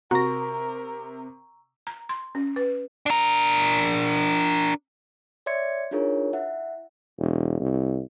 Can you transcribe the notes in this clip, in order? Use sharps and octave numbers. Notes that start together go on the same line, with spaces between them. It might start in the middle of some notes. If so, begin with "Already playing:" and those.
C3 F#4 A#4 A#5 C#6 A#6
A#5
C6
C#4
B4
D4 A#4
C#5 D5 E5 C6 G#6 C#7
D4 D#4 F4 G#4 A#4 C#5
E4 E5 F#5
E1
C2